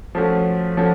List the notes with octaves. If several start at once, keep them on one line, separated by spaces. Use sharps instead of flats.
F3 A3 C#4 F#4
F3 A3 C#4 F#4